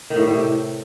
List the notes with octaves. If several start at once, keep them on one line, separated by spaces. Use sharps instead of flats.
D#3
A2
G3
A2
C3